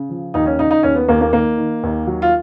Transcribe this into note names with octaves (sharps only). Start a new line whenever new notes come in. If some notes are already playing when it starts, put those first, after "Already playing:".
Already playing: C#3
F3
D#2 D#4
C#4
C#3 D#4
D#4
D#2 C#4
B3
D#2 A#3
A#3
D#3 A#3
D#3
D#2
F#3
F4